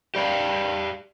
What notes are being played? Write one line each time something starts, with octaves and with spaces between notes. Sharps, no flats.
G4 D5 F5